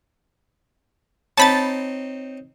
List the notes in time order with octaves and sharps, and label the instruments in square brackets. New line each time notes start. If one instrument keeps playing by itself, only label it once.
[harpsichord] C4 D#4 C#5 [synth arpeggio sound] A5 B5 A6